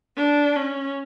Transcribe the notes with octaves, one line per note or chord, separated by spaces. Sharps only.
D4
C#4